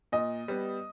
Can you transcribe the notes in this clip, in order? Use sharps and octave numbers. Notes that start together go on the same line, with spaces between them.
A#2 D#5
G3 B3